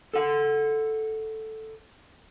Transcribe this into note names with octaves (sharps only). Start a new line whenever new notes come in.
A4 F#5